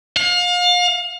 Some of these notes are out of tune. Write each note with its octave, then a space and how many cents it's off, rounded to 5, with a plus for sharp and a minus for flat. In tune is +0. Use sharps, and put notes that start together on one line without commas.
F5 +35